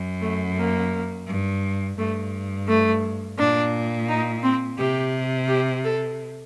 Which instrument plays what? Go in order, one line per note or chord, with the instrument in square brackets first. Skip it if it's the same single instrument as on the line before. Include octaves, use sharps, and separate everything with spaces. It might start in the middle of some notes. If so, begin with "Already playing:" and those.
Already playing: [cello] F#2
[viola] A3
A#3
[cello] G2
[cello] G2 [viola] A3
[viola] A3
[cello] A#2 [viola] D4
[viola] D#4
C4
[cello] C3 [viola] G4
[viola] G4
A4